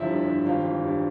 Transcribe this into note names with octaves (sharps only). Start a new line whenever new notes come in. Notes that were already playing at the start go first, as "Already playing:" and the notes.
Already playing: G1 F3 E4 E5
G2
G1
G#1 F4 F5
E3
G2